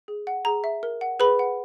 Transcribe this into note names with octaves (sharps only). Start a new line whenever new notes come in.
G#4
F#5
G#4 A#5
E5
A#4
F#5
G#4 B4 B5
F#5